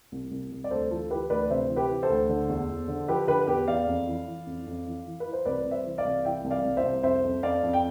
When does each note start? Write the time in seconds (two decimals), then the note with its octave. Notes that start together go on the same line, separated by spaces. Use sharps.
0.12 C2
0.31 C2
0.51 C2
0.64 D5
0.71 D2 A4 C5
0.91 E3 F4 A4
1.10 E3 G4 B4
1.30 D2 B4 D5
1.50 C3 C5 E5
1.70 E3
1.76 G4 B4
1.89 E3
2.03 A4 C5
2.10 D2
2.29 D3
2.49 E2
2.69 E2
2.88 D3
3.08 F3 G4 B4
3.27 D3 G4 B4
3.47 E2 G4 B4
3.67 E2 D5 F5
3.87 F2
4.07 E3
4.27 E3
4.46 F2
4.67 F2
4.86 E3
5.06 E3
5.20 B4
5.26 E3
5.33 C5
5.45 C2 B4 D5
5.65 C2
5.71 C5 E5
5.85 E3
5.98 D5 F5
6.05 C2
6.25 E3 E5 G5
6.44 C2
6.50 D5 F5
6.64 C2
6.77 C5 E5
6.83 C2
7.03 F2 C5 E5
7.24 F2
7.43 F2 D5 F5
7.63 F2
7.73 G5